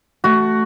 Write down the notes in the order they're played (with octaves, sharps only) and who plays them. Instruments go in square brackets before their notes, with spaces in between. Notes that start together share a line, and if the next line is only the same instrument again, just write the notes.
[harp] A3 [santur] F#4